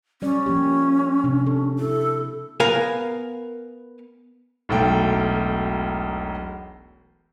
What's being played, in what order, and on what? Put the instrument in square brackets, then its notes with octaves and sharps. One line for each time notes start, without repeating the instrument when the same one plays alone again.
[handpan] G3 D5 [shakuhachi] C#4
[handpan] F3 A#3 G4
C3 D4
A4
[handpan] E4 [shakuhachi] A4
[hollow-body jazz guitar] B3 A#4 F5 G#5
[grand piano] E1 B1 A3 G5